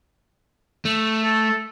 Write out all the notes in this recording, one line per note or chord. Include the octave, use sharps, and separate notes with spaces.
A3
A4